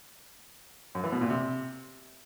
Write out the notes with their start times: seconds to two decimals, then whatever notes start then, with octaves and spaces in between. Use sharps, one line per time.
0.95 F#2
1.04 E3
1.12 B2
1.21 A#2
1.30 C3